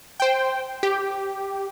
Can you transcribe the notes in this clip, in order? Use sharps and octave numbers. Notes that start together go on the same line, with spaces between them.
C5 G5
G4